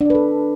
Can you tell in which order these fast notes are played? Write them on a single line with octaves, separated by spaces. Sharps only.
D4 D5 B4 A4